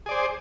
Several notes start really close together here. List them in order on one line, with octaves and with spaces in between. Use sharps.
G#4 D5 C5